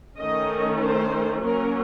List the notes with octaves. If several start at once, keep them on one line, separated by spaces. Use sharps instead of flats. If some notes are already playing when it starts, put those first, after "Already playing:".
D#3 A3 C#4 D#5
C5
F#3 A#3 C#4 A#4